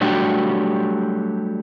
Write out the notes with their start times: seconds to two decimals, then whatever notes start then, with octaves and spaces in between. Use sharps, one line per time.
0.01 F#3 G3 A3 D4 F#4 G4